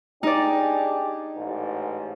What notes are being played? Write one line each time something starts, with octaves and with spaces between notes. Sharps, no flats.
D4 D#4 G4 G#4 D5
A1 G#2